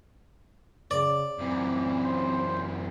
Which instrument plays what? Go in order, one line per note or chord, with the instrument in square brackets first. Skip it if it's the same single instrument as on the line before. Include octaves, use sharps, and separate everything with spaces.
[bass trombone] C#3 [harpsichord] D5
[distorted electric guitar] F#2 E3 [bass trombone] C4
[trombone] C5